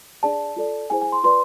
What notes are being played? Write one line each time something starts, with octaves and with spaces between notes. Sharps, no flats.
D4 G#4 D5 A5
F4 A4 D5
E4 G#4 C5 G#5
G#5
C6
F4 B4 D5 C6